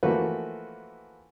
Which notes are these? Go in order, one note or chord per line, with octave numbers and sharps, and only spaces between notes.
E3 F3 A3 A#3 F#4 B4